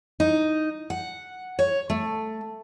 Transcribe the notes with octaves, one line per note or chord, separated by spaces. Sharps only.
D#4
F#5
C#5
A3